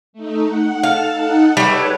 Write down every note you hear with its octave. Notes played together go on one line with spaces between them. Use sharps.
A3 D#4
F#5
A4 F5 A5
D#4 F#5
G3 A3 B4 C#5